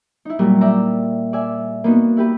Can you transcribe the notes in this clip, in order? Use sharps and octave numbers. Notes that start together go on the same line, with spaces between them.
D#4 E4
A#2 F#3 G3 A#4
D5 E5 G5 A#5
D5 E5 G#5
A#3 B3 D#4 F#4
E4 G4 B4